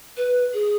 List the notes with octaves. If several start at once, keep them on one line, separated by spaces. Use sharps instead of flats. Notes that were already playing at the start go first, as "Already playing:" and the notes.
B4
G#4